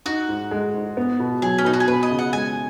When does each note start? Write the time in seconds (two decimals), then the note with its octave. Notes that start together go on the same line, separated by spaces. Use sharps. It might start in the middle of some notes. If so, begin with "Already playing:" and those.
0.06 D#4 F#4
0.29 G#2
0.51 G#3
0.74 G#2
0.97 B3
1.20 B2
1.42 F#3 G#4
1.58 C#4
1.65 B2 D#4
1.73 F#4
1.80 G#4
1.88 B3 B4
2.03 D#5
2.11 C#3
2.19 F#5
2.33 G#3 G#5